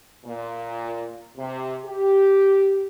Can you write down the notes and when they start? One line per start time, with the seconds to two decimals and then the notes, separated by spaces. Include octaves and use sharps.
0.25 A#2
1.37 C3
1.85 G4